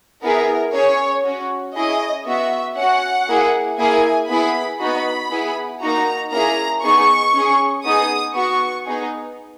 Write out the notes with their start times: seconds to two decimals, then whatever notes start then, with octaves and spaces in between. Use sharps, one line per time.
0.23 B3 E4 G#4 A#4
0.74 C#4 G#4 C#5
1.25 C#4 F#4
1.75 C#4 E4 G#4 D#5
2.26 B3 F#4 E5
2.77 C#4 F#4 F#5
3.28 A#3 E4 G#4
3.78 A#3 E4 G#4 G#5
4.29 B3 E4 G#4 B5
4.80 B3 D#4 F#4 B5
5.31 B3 E4 G#4
5.81 A#3 D#4 F#4 A#5
6.32 A#3 C#4 E4 G#4 A#5
6.83 B3 D#4 G#4 C#6
7.34 C#4 G#4
7.84 B3 D#4 G#4 D#6
8.35 B3 F#4 C#6
8.86 B3 D#4 G#4